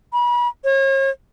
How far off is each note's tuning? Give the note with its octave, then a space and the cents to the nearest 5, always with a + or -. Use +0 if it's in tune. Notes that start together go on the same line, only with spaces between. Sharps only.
B5 -35
C#5 -40